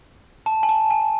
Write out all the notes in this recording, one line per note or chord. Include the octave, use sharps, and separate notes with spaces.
A5
G#5
A5
G#5